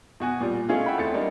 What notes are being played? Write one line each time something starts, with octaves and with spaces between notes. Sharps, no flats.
B2 F#4 G#5
A#2 G3
G#3 A3 C#4 E4 F4 G#4
E5 F#5 G5 B5
E2 A3 C4 A6 C#7
G3 A#3 D4 D#4